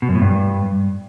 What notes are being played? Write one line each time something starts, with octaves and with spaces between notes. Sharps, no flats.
B2
F#2
A2
G2